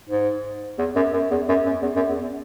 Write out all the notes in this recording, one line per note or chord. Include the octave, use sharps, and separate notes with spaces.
G#2
E2
F#2
F#2
E2
F#2
F#2
E2
F#2
E2